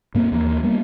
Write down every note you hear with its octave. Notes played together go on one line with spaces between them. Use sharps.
G#2 A#3 C4
D#2 E3 A#3
G3 A#3 B3